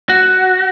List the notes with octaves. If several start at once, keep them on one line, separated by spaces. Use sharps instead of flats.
F#4